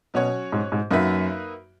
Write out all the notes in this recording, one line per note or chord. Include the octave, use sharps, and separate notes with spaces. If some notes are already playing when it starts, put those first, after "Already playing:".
B2 F#3 C#4 F#4 C#5
G#2
G#2
F#2 A#3 D#4 F#4 B4 E5